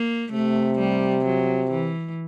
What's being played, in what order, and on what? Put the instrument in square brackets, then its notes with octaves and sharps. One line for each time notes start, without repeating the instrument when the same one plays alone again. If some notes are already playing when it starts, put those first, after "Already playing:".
Already playing: [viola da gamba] A#3
[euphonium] C3 [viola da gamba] A3
[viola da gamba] G3
F#3
E3